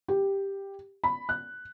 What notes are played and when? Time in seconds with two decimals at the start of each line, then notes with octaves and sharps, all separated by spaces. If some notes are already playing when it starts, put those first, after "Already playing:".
0.08 G4
1.04 B5
1.29 F#6